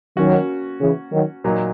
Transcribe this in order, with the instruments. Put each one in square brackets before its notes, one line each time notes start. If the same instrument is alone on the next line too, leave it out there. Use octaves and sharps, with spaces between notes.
[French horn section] D#3 F#3 [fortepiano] A#3 C#4 F#4
[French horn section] C#3 E3
D#3 F#3
[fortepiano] A#2 F#3 A#3 D#4